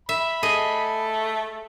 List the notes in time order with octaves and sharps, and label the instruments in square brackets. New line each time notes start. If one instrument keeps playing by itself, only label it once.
[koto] E5 [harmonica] B5
[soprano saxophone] A3 [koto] G#4 D#5